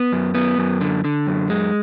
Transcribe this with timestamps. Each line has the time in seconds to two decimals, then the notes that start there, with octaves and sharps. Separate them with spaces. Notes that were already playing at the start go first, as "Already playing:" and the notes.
Already playing: B3
0.13 F#2
0.35 B3
0.58 F#2
0.81 D3
1.05 D3
1.27 F#2
1.50 G#3